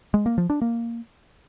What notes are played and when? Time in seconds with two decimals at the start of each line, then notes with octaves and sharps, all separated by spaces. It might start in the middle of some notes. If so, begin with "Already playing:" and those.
0.14 G#3
0.26 A#3
0.38 F3
0.50 D4
0.61 A#3